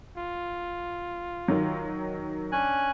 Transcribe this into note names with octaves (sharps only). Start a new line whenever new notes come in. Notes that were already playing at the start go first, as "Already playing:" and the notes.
F4
D#3 F#3
C#4 D4 G#5 F#6